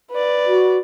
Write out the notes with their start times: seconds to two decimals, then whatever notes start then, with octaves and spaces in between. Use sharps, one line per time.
0.11 B4 D5
0.47 F#4